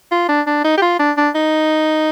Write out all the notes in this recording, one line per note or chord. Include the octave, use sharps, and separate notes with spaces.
F4
D4
D4
D#4
G4
F4
D4
D4
D#4